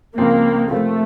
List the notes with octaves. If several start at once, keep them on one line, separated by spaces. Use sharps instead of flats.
C#2 C#3 F3 A#3 C4
C3 F3 A3 A#3 F4 C5